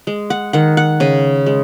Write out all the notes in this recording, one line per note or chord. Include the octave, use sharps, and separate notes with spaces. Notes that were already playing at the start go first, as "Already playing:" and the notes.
G#3
F#5
D#3 F#5
F#5
C#3 G#5
G#3